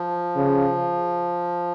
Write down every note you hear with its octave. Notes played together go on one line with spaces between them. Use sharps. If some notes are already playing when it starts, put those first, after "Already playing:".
Already playing: F3
C#3